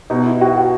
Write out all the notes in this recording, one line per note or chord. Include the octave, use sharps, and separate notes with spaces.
B2 D#4
E4
F#4
F#4